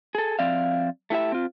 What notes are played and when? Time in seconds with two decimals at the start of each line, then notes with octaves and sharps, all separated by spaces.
0.15 G#4 A4
0.39 F3 C4 D5 E5 F5
1.10 A3 E4 G4 E5
1.32 C4 F4